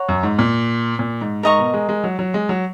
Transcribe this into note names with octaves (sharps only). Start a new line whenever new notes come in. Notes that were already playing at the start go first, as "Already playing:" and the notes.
Already playing: C#5 F#5 A#5
F#2
G#2
A#2
A#2
G#2
G#2 A#4 D#5 A#5 C#6
B2
G#3
G#3
F#3
F#3
G#3
F#3